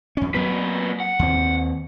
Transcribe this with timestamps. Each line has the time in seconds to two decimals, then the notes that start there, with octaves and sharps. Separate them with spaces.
0.17 F2 C#4
0.35 A#2 F#3 B3 B4
1.00 F#5
1.19 D#2 C4